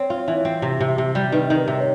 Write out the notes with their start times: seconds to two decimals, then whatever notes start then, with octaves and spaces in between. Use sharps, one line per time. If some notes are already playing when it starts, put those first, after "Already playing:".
Already playing: C4 C#5
0.10 F4
0.28 E3
0.45 C4
0.62 C3
0.81 C3
0.98 C3
1.15 G3
1.32 D#3 B4
1.50 D#3
1.55 B4
1.68 C3
1.79 C#5